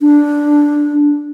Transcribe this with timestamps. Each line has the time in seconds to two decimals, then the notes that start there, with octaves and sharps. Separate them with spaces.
0.01 D4